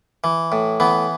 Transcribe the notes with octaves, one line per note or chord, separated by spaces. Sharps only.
E3
A2
E3 B3